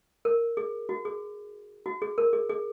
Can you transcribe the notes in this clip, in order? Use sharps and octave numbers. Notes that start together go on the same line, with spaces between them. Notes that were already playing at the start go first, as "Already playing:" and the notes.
A#4
G#4
F#4
G#4
F#4
G#4
A#4
G#4
G#4